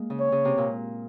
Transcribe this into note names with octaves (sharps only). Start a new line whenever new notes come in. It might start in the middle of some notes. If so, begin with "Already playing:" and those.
Already playing: G#3 A#3
C#3
C#5
C#3
C3
A#2